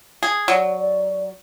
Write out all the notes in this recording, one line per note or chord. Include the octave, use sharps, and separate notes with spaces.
G#4
F#3 D5
D5